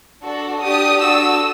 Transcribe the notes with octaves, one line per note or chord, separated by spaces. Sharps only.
D4 F#4 A4
D4 G4 D#6
D4 F#4 A4 E6